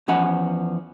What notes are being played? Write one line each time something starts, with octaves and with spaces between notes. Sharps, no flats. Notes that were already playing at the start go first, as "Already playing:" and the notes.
E2 F3 C#4 D#5 F#5 B5